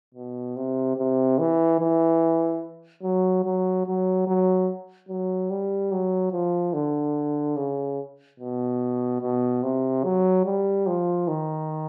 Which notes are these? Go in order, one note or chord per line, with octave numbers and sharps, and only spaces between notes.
B2
C3
C3
E3
E3
F#3
F#3
F#3
F#3
F#3
G3
F#3
F3
D3
C#3
B2
B2
C3
F#3
G3
F3
D#3